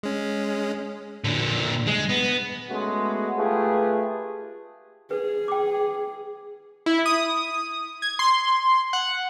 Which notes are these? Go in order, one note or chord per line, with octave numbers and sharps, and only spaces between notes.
G#3 C#4
A#2 D3
G#3
B3
G#3 A3 B3 C#4 F#4
A3 F4 G4 G#4 B4
G#4 B4
G5 D6
E4
D#6
G#6
C6
F#5